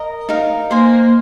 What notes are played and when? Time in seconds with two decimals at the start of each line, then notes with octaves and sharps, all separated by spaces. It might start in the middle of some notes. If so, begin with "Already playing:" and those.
Already playing: A#4 D#5 A#5 D#6
0.29 D#4 A#4 F5
0.70 A#3 C5 G#5 C6